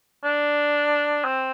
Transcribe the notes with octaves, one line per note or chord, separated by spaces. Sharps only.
D4
C4